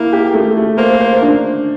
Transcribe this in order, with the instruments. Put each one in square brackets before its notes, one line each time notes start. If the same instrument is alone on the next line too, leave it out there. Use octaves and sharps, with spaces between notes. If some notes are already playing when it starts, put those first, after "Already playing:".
Already playing: [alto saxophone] A#3 [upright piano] E4
[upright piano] G4
A3
A3
[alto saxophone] A#3 [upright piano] C5
[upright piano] C5
D4